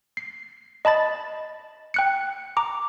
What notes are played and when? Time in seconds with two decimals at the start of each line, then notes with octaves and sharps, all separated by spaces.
0.17 C7
0.85 D#5 A5 B5 A6
1.94 G5 F#6 C#7
2.57 A#5 D6